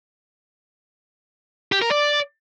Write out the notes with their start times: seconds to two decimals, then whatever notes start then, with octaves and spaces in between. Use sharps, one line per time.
1.72 G4
1.82 A#4
1.91 D5